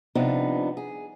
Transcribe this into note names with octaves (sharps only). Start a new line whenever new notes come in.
G2 C3 F3 B3 D4 D#4
G#4